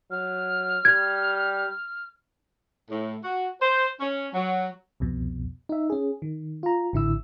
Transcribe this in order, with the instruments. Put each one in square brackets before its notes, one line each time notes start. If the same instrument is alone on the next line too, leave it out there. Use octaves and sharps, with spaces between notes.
[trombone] F#3 [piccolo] F6
[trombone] G3 [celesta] G#6
[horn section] A2
F#4
C5
C#4
F#3
[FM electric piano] C2 F2 B2
D#4 E5
C#4 G#4
D#3
F4 A#5
A1 D3 E4 E6